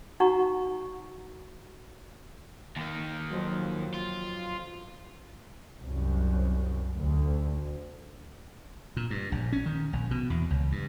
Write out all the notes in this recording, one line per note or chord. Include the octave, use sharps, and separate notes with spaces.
D#4 F#4 F#5 A#5 C#6
D#2 D#3
F2 F#3
F4
C2 F#2
D2
A#2
G2
A#1
C#4
D#3
A#1
B2
E2
C#2
G2